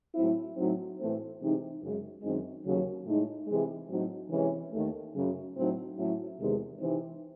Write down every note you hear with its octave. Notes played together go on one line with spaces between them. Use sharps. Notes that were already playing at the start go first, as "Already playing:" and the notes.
A2 F#3 C4 E4
A2 F#3 C4 D#4
A2 E3 A3 C4
C3 E3 G#3 D#4
F#2 C#3 G#3
F#2 D#3 G#3 C4 D#4
D#2 C#3 F#3
A2 G#3 D#4
C3 E3 G#3
A2 F#3 C4 D#4
C3 E3 G#3 C#4
D#2 D#3 A3
F#2 C#3 F#3
A2 F#3 C4 D#4
A2 F#3 C#4 E4
E2 C3 D#3 G#3
C3 E3 C4 D#4